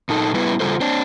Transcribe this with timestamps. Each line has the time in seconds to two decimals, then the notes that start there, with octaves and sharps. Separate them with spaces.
0.09 A#2 D#4 A4
0.34 G3 B3 E4 B4
0.60 E2 C#3 G3 F4 A4 C5
0.81 C4 D4